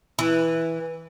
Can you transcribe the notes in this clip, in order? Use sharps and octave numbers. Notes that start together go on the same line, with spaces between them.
E3